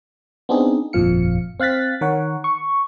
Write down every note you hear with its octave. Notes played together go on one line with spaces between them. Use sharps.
B3 C4 D4 D#4 G#4
G1 F2 A#2 F3 F5 C#7
C4 F5 F#6 A6 B6
D#3 A#4 C#5 F#5
C#6